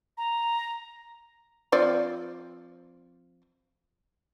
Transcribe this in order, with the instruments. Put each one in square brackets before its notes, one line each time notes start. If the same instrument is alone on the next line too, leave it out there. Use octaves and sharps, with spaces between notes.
[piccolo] A#5
[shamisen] F3 C4 D5